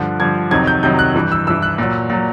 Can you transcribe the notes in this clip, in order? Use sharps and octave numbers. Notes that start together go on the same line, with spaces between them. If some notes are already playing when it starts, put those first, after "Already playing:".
Already playing: G2 D3 F3 F#6
G2 D3 F3 G#6
F2 C3 D#3 F#3 G#6
G6
F2 C3 D#3 F#3 G6
F#6
G2 E3
E6
G2 E3 E6
F#6
A#2 F#3
A#2 F#3